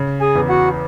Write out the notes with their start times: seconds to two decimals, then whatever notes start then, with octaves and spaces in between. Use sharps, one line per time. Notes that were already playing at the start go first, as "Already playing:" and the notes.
Already playing: C#3
0.20 G#4 G#5
0.36 E2
0.49 F#4 F#5